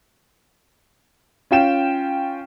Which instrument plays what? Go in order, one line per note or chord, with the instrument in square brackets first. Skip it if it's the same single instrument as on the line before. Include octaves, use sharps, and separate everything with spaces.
[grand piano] C#4 F4 G5 E7